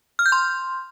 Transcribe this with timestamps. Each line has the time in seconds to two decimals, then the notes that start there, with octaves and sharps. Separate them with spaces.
0.19 F6
0.26 G6
0.32 C6